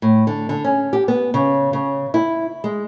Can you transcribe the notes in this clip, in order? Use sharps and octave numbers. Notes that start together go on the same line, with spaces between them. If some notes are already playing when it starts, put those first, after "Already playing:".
A2
D3
D3
C#4
G4
B3
C#3
C#3
E4
G#3